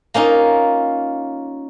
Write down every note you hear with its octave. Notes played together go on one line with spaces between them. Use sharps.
A#3 C#4 D#4 F4